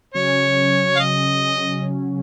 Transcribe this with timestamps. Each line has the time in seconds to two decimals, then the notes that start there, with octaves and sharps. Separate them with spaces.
0.14 C#3 F#3 C#4 C#5
0.96 F5
1.00 D#5